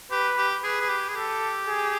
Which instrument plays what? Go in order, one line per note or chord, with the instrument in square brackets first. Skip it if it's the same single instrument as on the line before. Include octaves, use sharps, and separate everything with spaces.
[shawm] G4 [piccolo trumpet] B4
[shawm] G4
[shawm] G#4 [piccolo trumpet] B4
[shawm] G#4
G4
G#4
[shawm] G4 [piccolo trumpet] A4
[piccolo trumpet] G#4